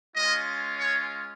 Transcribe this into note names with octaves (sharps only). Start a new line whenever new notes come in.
G#3 C#4 F4 D#5
C#5